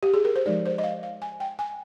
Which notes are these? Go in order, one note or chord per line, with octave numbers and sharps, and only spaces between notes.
G4
G#4
A#4
C5
F3 G#3 D#4 D5
C5
D#5
F5
F5
G#5
G5
G#5